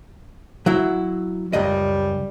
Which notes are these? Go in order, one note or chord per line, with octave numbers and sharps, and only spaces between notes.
F#3 E4
C#2 F#2 G3 D#5